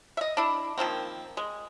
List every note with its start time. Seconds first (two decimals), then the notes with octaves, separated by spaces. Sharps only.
0.17 D#5 E5
0.37 D4 E4
0.78 D#3 F3 A#3 C4
1.37 G#3